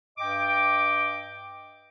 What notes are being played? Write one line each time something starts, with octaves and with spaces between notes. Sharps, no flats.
G2 D#5 G5 D6